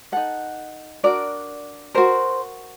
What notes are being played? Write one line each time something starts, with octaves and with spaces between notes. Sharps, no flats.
D#4 A4 F#5
D4 F#4 A#4 D5
F#4 A#4 C5